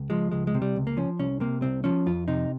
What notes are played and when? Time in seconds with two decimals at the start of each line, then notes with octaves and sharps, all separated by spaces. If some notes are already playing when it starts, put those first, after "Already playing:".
Already playing: C#2
0.10 F3 G#3
0.32 C#2 G#3
0.47 G#3
0.54 C3
0.62 G3
0.76 C#2
0.87 A#3
0.97 F3 C#4
1.19 C2 C#4
1.40 C3 A#3
1.62 C2 C4
1.84 F3 C#4
2.06 F2 F4
2.28 C3 D#4